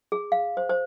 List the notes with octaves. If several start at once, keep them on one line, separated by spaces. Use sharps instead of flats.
G#4
F5
C5
C5